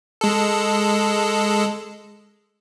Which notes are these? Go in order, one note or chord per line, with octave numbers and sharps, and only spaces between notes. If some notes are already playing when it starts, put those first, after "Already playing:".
G#3 A4